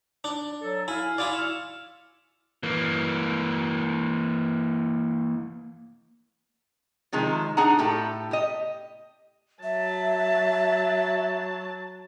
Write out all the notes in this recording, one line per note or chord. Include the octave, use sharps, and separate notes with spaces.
D4
F#3 A4
E4 F5 G#5
E4 F4 D5
C#6 E6 F6
E3 A#3
C3 D#3 F3 G#3
D4 D#4 G#4 F#5 A#5
A2 G4 A4
G4 D#5
F#3 E5 A5